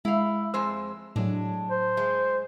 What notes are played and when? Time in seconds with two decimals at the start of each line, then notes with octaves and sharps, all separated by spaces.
0.05 G#3 E4 F5
0.54 F2 G#3 C5 E6
1.16 A2 F#3 G#3 D4
1.71 C5
1.97 G#3